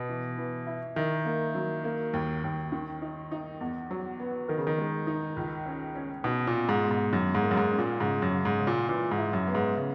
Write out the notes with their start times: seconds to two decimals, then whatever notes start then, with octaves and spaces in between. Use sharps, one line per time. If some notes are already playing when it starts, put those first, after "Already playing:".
Already playing: B2 B3
0.09 E3
0.38 E3
0.67 E4
0.96 D#3 E4
1.25 A#3
1.55 F#3
1.84 A#3
2.13 D#2
2.44 D#2
2.72 D#3
3.02 D#4
3.31 D#4
3.61 E2
3.91 F#3
4.20 B3
4.48 D#3 A#4
4.58 C#3
4.67 D#3
4.78 G#3
5.07 D#4
5.37 C#2
5.66 C#4
5.95 C#4
6.24 B2 D#4
6.47 A#2
6.55 B2
6.69 G#2
6.84 B2
6.91 G#2
7.12 F#2 D#3
7.35 G#2
7.42 A#3
7.51 F#2
7.57 G#2
7.71 C#4
7.78 A#2
8.00 G#2 C#3
8.22 F#2
8.31 C#3
8.45 G#2
8.60 C#3
8.67 A#2
8.89 A#2 E3
9.11 G#2
9.18 E4
9.33 F#2
9.48 B3
9.55 G#2
9.77 C#3